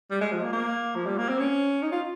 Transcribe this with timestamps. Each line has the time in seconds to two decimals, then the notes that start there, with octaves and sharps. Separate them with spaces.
0.11 G3
0.21 G#3
0.32 F3
0.42 A#3
0.53 A#3
0.95 F3
1.06 G3
1.18 A#3
1.29 C4
1.39 C#4
1.82 D#4
1.92 F4